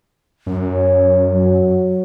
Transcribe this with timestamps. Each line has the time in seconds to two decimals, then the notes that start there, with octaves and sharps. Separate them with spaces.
0.46 F#2
0.71 C#5
1.31 F#3